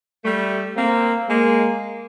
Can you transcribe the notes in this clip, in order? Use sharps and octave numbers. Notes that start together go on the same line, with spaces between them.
G3 A3
A#3 C4
G#3 A#3